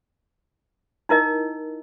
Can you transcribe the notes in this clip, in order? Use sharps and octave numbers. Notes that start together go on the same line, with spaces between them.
D#4 E4 A#4 D#5